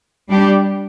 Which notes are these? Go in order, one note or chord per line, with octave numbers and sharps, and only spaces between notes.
G3 D4 G4